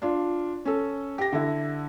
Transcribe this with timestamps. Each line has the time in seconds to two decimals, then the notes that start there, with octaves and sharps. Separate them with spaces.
0.02 D4 F4
0.65 C#4 A4
1.18 G4 A#6
1.32 D3 E4